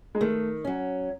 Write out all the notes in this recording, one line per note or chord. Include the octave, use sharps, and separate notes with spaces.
G#3
D#3 A3
F#3 C#4